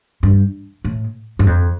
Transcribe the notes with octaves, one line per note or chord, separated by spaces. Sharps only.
G2
A2
G2
F2